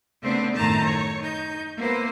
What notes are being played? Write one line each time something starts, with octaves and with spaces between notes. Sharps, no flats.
C#3 A3 B3 C4 D4 C5
F#2 A2 D#3 A5 A#5 G6
C#5
D#4 G6
A#3 B3 E4 B4 C5